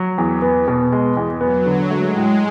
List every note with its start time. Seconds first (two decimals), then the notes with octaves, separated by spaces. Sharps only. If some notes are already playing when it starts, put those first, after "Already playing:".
Already playing: F#3
0.18 E2
0.42 B3
0.68 B2
0.92 G#3
1.17 E2
1.41 F#3 B3
1.66 D3
1.90 G#3 A3
2.16 A2